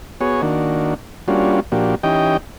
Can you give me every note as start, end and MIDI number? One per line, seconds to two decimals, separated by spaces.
0.21 0.42 59
0.21 0.42 66
0.21 0.42 68
0.21 0.42 73
0.42 0.94 51
0.42 0.94 58
0.42 0.94 62
0.42 0.94 66
1.28 1.60 55
1.28 1.60 58
1.28 1.60 61
1.28 1.60 62
1.28 1.60 65
1.28 1.60 66
1.72 1.95 46
1.72 1.95 53
1.72 1.95 58
1.72 1.95 62
1.72 1.95 66
1.72 1.95 67
2.03 2.37 52
2.03 2.37 61
2.03 2.37 63
2.03 2.37 67
2.03 2.37 75
2.03 2.37 79